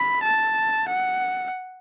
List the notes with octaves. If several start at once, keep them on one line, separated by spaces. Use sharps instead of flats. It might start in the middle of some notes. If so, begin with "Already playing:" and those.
Already playing: B5
A5
F#5